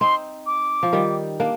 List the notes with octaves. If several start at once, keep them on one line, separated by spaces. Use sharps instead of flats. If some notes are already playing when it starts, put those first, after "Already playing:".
C4 D#4 C6
D6
F3
D#3 G3
A#3 D4